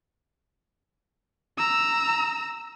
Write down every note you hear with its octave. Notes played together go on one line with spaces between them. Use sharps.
A#5 E6